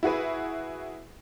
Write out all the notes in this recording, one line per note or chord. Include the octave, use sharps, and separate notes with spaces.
E4 F#4 G#4 B4